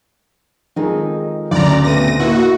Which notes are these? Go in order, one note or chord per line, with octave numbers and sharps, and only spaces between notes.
F2 D#3 G#3 D#4
D2 C#3 D5 A#5
B2 A3 C4 A#6 D#7
A#3 D#4 E4 F#4